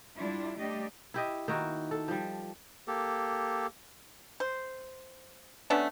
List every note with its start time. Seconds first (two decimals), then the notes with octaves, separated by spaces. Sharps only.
0.16 G3 D4 E4 F4
0.58 G3 A3 D4 G4 D#5
1.14 E4 G4 D#5
1.48 D#3 A#3 E4 F#4
1.91 A4
2.08 F3 G3
2.88 A#3 G4 A4
4.40 C5
5.70 A3 B3 C#4 D4